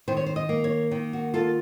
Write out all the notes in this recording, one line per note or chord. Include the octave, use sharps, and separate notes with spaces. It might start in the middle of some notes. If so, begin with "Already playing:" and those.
D#3 C5
C#5
C5
D#5
A#3
C#5
D#3
F#4
F4 A4